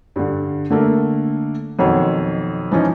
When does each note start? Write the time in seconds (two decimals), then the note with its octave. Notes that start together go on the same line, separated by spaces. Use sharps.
0.16 G2 D3
0.70 D3 A3 A#3
1.79 F2 B2 D#3 F#3 C#5
2.71 E3 F3 C#4 D#4